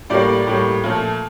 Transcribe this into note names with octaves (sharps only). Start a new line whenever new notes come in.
A2 G3 A#3 D5
A2 G3 A#3
A#2 F3 A3